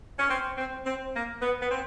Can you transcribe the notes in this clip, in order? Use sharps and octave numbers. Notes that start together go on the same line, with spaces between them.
C#4
C4
C4
C4
A#3
B3
B3
C4